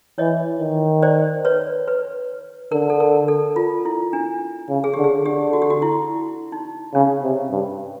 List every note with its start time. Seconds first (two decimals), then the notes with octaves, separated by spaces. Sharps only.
0.18 E3 C#5 D#5
0.60 D#3
1.02 C5 D5
1.45 B4 C#5
1.88 B4
2.72 D3 A#4
2.90 A4
3.00 A#4
3.28 A4
3.56 F4
3.85 E4
4.13 D4
4.69 C#3
4.84 G#4
4.94 D3 G4
5.04 G#4
5.25 D3 G4
5.53 F#4
5.62 G4
5.70 F#4
5.82 E4
6.52 D#4
6.94 C#3 C#4
7.23 C3
7.51 G2